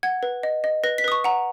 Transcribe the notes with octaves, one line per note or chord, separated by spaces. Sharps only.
F#5 G#6
B4
D#5
D#5
B4 A#6
B6
B4 D#6
C#6
F#5 A#5